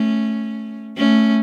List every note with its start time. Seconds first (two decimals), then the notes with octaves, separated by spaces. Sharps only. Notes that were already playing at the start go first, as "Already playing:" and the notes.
Already playing: A3 C#4
0.97 A3 C#4